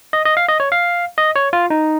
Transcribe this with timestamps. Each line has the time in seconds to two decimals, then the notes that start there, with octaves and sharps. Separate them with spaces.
0.13 D#5
0.25 D#5
0.37 F5
0.48 D#5
0.60 C#5
0.72 F5
1.18 D#5
1.36 C#5
1.53 F4
1.70 D#4